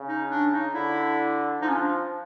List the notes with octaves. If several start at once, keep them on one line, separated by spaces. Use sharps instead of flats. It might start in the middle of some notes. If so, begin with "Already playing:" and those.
Already playing: C#3
D#4
D4
D#4
D3 E4
F3 D#4
C#4
D4